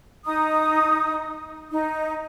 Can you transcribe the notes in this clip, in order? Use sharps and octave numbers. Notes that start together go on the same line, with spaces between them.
D#4 D#6
D#4